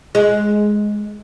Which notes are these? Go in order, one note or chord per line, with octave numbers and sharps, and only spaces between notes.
G#3